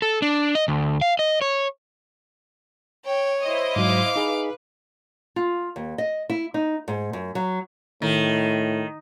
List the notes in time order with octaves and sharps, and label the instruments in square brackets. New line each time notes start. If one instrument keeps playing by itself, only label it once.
[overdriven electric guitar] A4
D4
D#5
D2
F5
D#5
C#5
[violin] C#5 [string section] G5
[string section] E4 C5 D#5
[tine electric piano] G#2 F#3 [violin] F5 D6
[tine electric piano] D#4 G#4 [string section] B4
[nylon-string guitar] F4
D#2
D#5
E4
D#4
G#2
F#2
F#3
[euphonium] A2 [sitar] D#3